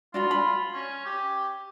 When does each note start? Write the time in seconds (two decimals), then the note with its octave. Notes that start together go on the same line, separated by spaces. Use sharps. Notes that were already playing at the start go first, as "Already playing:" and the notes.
0.14 D4 F4 F#4 B5
0.31 B5
0.73 C#4
1.06 G4